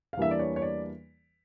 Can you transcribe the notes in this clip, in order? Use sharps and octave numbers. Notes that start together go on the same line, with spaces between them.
F5
E2 E3 G3 A#3 D4 E5
D5
C#5
C#5
D5